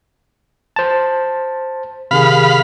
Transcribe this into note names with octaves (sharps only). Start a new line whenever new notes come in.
C5 A5
C3 D#3 G#4 F5 B5